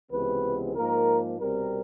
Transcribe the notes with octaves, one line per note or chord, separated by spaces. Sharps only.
C#2 C3 E3 G#3 B3 B4
G#2 F3 A#3 A#4
C2 B2 G3 C4 A#4